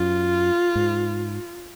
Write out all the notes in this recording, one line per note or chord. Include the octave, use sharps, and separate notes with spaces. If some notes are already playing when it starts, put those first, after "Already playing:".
Already playing: F#2 F4
G#2